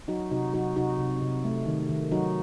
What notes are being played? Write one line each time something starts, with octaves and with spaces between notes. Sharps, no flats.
F#3 D#4 F#4
C3 D#4 F#4
F#3 D#4 F#4
C3 D#4 F#4
C3
C3
A3
D#3
D#3
F#3 D#4 F#4